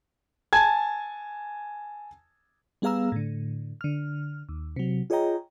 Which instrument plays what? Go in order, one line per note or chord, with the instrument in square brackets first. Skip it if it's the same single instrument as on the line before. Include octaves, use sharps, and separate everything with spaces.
[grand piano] G#5 A5 G#6
[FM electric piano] G3 B3 G#4 F5 A#5 E6
A2 D3
D3 F6
D#2
C3 F#3
F4 G#4 C#5 D#5 G5 A#5